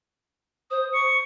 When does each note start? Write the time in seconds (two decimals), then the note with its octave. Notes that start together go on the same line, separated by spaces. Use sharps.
0.71 C5 D#6
0.93 C#6 C#7